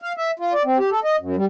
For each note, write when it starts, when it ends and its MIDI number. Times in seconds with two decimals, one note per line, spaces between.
0.02 0.13 77
0.17 0.31 76
0.39 0.53 65
0.53 0.63 74
0.65 0.78 60
0.78 0.90 67
0.91 1.00 69
1.04 1.16 75
1.19 1.36 42
1.36 1.45 55